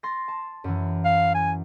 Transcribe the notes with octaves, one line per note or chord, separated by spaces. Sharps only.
C6 A6 A#6
A5
F#2 E3
F5
G#5